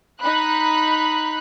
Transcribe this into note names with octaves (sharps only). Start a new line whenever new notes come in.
D#4 B5 F#6